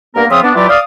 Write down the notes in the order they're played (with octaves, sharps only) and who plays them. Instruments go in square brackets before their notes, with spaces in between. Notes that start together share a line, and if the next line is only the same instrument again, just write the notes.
[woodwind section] G2 A#3 B3 A#4
C#3 F3 C4 F4 E5 D#6
B3 D4
E3 F#3 F4 G4 B4 D5
D5 F5 D#6